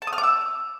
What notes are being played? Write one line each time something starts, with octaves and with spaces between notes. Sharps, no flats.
A5
D#6
F6
D6
E6